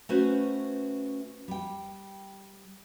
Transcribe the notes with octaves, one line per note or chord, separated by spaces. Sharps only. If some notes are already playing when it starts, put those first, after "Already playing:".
A3 C#4 F#4 B4 C5
G3 G5